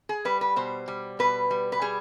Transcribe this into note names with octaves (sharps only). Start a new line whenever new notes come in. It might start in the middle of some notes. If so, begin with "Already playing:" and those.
G#4
G3 B4
B4
B2 C5
G3
B2 B4
G3
B4
G3 G#4